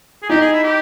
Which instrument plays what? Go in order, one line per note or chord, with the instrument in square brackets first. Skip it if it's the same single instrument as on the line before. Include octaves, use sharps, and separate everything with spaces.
[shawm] G#4
[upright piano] D#4 [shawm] G4
[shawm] G#4
E4
G4